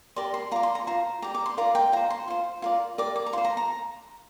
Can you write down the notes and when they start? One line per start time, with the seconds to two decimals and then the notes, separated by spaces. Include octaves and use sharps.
0.16 G4 A#4 D5 C6
0.34 C6
0.51 F4 D5 A#5
0.63 C6
0.75 A#5
0.87 F4 C5 A#5
1.22 G4 D5 A#5
1.35 D6
1.46 C6
1.58 F4 A#4 D5 A#5
1.75 G5
1.92 F4 C5 A#5
2.10 C6
2.28 F4 C5
2.62 F4 A#4 D5
2.98 G4 A#4 D5 D6
3.16 D6
3.26 A#5
3.33 F4 C5 C6
3.45 A#5
3.57 A#5